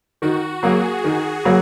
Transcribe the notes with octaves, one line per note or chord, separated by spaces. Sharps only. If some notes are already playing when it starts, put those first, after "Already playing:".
D#3 F#4
F#3 A#3 G#4
D#3 G#4
F#3 A#3